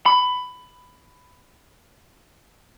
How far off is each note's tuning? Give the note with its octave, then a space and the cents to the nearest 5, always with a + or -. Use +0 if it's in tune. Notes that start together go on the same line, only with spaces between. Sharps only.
B5 +15